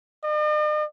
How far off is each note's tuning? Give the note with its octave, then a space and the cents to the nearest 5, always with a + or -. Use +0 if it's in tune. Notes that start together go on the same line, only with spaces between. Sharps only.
D#5 -45